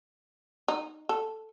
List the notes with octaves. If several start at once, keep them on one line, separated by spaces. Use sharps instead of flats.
D#4
A4